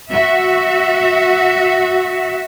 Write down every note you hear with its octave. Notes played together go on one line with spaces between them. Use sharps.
F#4 E5